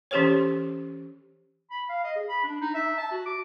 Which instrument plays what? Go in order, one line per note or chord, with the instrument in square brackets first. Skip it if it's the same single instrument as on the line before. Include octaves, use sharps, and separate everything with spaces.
[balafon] E3 C#4 G4 A4 C5 C#5
[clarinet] B5
F5
D#5
G#4
B5
D4
D#4
E5
A5
F#4
D6